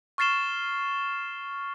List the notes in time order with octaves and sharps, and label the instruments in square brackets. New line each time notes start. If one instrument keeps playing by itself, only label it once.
[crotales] C#6 F6 A6 C7 E7 G7